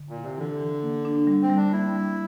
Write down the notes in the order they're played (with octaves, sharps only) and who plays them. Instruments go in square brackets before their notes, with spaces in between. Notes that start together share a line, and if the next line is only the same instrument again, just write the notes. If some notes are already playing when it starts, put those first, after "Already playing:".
Already playing: [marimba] D3
[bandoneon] A#2
[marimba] E4
[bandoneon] C3
[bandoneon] D3 [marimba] E3
[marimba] E3
A#3
D4
G3
[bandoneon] C4
[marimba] G3
[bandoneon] D4
[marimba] A#3 [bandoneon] E4
[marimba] G3